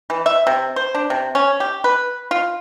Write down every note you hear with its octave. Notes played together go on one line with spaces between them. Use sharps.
E3
E5
C3
C5
D4
C3
C#4
G4
B4
F4